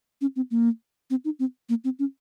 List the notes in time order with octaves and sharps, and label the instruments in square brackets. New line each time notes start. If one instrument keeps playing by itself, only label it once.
[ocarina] C#4
C4
A#3
C4
D#4
C4
A#3
C4
C#4